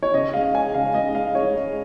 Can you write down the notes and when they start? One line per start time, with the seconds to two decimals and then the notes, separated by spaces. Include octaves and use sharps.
0.03 C#5
0.13 C#3 D#5
0.34 G#3 F5
0.53 G#3 G#5
0.74 C#3 F5
0.94 G#3 D#5
1.14 G#3 F5
1.35 G#3 C#5
1.55 G#3